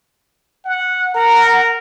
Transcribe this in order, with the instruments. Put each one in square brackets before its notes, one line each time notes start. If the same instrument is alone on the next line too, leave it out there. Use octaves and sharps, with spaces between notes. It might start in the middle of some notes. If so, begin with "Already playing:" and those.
[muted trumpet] F#5
[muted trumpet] A#4 [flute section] F#5 A#5